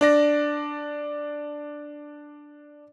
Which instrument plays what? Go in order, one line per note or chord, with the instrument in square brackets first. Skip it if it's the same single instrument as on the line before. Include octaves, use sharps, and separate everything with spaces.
[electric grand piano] D4 D5 A#6